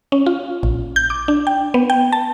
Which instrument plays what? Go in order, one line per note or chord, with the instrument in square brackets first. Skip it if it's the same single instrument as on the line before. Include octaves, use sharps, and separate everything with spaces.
[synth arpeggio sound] C#4
F4
A#1
G6
D6
D4
G5
B3
G5
A5